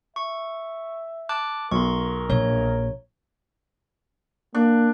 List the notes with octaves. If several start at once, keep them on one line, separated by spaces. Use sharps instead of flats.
E5 C#6
A5 D6 F#6
B1 A#4 C6 C#6
A#1 C#5
A#3 D4